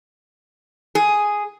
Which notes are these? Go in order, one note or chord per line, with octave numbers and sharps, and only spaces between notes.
G#4